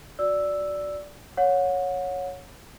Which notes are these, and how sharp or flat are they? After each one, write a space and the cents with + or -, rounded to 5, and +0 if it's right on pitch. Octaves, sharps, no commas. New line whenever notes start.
F#4 -20 D5 -5 E6 +0
C#5 +0 F#5 -35